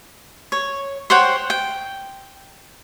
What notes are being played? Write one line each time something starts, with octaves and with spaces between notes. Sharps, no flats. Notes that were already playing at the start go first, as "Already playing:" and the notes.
C#5
C5 C#5 F#5 G5
G5